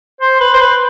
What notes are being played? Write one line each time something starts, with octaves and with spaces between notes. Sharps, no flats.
C5
B4
C5
B4